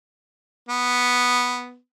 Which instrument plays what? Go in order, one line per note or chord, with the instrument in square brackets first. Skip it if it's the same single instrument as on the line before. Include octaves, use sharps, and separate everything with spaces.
[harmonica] B3